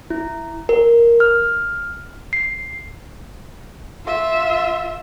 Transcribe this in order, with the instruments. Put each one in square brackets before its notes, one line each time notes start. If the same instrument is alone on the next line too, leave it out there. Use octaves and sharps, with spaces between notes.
[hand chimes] E4
A#4
F6
C7
[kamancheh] F4 E5